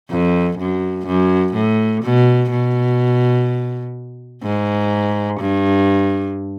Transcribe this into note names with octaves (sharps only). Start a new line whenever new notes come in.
F2
F#2
F#2
A2
B2
B2
G#2
G2